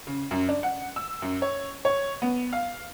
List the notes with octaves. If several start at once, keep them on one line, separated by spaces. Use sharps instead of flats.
C#3
F#2
D4
F#5
E6
F#2
C#5
C#5
B3
F5